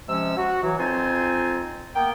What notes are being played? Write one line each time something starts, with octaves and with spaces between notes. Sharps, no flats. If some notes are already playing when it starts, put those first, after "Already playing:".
C3 F3 G#3 C#4 E6
F#4
E3 F#3
F2 C4 D#4 F4 C5 G#5
A#3 B3 G5